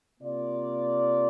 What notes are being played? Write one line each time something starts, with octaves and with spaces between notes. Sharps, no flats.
C3 A#3 F4 D5